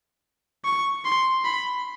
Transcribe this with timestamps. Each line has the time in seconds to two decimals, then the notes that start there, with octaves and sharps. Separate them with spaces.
0.65 C#6
1.05 C6
1.45 B5